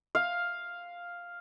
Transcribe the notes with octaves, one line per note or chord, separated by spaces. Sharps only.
F5